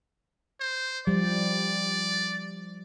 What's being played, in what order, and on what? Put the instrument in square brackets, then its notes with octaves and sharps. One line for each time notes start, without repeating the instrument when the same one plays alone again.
[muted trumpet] C5
[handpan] F3 G3 [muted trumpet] D5